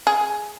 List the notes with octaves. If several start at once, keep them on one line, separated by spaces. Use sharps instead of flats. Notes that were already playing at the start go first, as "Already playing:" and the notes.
G#4